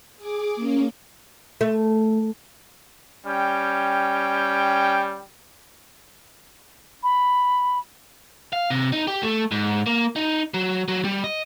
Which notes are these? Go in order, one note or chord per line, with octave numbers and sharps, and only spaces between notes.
G#4 D6
A#3 C#4
A3
G3 C#4 G5
B5
F5
C3
D#4
G4
A3
G#2
A#3
D#4
F#3
F#3
G3
D#5